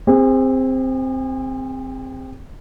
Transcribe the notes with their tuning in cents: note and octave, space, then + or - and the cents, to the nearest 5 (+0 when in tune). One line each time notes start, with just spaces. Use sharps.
C4 +0 G#4 -40